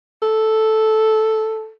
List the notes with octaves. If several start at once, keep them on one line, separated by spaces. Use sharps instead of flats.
A4